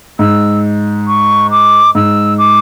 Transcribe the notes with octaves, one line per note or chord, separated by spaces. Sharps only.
G#2 E6
C#6
D6
G#2 E6
D6